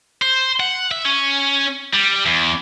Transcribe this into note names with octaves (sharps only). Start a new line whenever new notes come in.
C5
F#5
E5
C#4
G3
E2